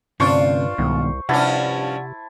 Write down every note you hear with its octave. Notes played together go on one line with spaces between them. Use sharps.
D2 G2 C3 C#4 D4 F4 C5 C#6
C2 G#2 B2 D#3
G2 C3 F3 C#4 E4 F#5 A5